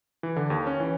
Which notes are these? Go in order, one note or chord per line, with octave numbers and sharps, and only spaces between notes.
E3
D3
D#2
C#4
E3